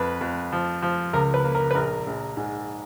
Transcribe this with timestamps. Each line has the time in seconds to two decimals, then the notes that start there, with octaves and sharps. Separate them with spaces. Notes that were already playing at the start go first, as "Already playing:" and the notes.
Already playing: F2 B4
0.21 F2
0.52 F3
0.82 F3
1.13 C#2 A#4
1.34 B4
1.45 A#3
1.55 A#4
1.71 B4
1.75 A#1 A#4
2.07 A#1
2.37 G#2